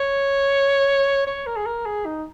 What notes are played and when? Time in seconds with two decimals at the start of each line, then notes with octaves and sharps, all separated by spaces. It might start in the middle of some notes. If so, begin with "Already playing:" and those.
Already playing: C#5
1.27 C#5
1.47 A#4
1.57 G#4
1.66 A#4
1.86 G#4
2.06 D#4